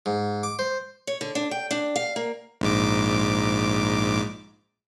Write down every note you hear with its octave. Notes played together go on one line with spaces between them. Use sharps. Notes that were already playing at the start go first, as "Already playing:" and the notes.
G#2
D6
C5
C#5
D3
D4
G5
D4
F5
A#3
A#1 G#2 D6